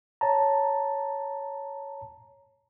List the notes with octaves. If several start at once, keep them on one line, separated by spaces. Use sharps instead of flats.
C#5 A5 A#5